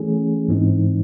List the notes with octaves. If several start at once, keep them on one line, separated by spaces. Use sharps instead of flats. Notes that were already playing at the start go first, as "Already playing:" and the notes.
Already playing: E3 A3 C#4 G#4
G#2 E3 G#3 C4 D#4